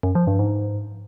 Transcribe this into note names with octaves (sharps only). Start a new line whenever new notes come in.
F#2
F3
G2
G#2